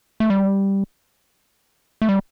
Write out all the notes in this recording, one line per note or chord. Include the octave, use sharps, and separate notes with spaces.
A3
G3
A3
G3